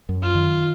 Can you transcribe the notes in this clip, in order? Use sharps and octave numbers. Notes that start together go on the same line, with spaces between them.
F#2
F4
D#3